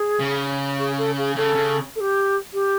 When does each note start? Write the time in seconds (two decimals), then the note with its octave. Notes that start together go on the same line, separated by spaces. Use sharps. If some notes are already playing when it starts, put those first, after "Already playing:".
Already playing: G#4
0.19 C#3
0.78 G#4
0.97 A4
1.17 G#4
1.36 C#3 A4
1.55 C#3
1.95 A4
2.00 G4
2.53 G4